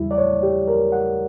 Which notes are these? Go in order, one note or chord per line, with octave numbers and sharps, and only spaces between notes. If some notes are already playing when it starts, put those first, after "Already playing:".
Already playing: E2 C#3 E3 G3 E4
D5
C#5
G4
A#4
F#5